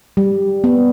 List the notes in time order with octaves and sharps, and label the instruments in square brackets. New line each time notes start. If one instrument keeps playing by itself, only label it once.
[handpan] G3
B3